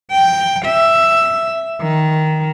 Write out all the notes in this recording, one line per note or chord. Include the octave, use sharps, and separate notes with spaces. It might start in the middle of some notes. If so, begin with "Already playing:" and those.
G5
E5
D#3